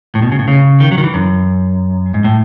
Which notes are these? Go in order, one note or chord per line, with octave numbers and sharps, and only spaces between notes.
A2
B2
C#3
A2
C#3
D#3
F#3
D#3
E3
F#2
G#2
A2